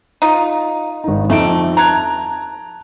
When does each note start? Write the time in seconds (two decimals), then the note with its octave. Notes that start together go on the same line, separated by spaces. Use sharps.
0.22 D#4 F4
1.04 G#1 D#4
1.30 F2 A3 D#4 D7
1.77 A5 A#5 F#6 G#6